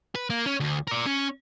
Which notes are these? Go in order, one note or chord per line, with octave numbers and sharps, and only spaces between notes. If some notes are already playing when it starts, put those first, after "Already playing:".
B4
A#3
C#4
D2
A#4 D5
C#4